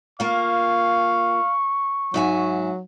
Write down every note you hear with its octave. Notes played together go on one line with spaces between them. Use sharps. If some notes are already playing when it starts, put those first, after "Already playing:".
A#3 F4 F5 C#6
G#2 F#3 E5 G#5